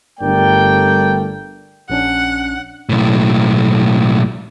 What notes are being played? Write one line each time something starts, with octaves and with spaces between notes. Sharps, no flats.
G1 G2 A3 A#4 D5 G5
A#1 C#4 D4 F#5
B1 A2